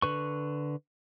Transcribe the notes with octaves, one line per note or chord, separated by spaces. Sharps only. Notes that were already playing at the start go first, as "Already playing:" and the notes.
D3 B4 C#6